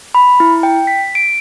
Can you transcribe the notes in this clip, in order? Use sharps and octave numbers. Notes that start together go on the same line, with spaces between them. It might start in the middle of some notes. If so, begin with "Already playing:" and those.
B5
E4
G5
B6
D7